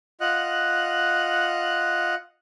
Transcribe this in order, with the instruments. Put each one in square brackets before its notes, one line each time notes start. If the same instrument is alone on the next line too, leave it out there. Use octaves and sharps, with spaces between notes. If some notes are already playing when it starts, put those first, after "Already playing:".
[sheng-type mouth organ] F4 D#5 F#5 F#6